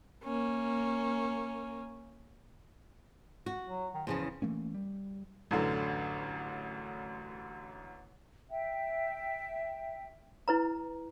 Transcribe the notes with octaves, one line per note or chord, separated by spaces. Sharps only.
A#3 C#4
F#4
F#3
D#3
E2 C#3 F3 C#4
E3 A3 A#3 C#4
G3
A1 F#2 D3
E5 G5
E4 B4 A#5